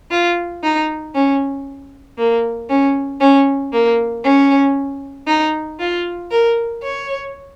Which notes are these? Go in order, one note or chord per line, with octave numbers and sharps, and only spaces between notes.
F4
D#4
C#4
A#3
C#4
C#4
A#3
C#4
D#4
F4
A#4
C#5